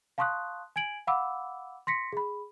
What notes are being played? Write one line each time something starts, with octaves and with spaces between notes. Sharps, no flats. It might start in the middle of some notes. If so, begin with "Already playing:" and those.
F5 A5 C6 C#6 D#6 F#6
G#5 G#6 D7 F#7
F5 F#5 B5 D6 E6
C6 A#6 B6 C#7
G#4 B5